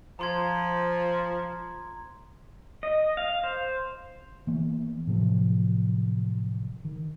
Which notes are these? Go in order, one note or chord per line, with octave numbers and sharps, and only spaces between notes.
F3 A#5 C6 G#6
D#5
F5
C5
E3 A#3 B3
A2 C3 F3 F#3
D#3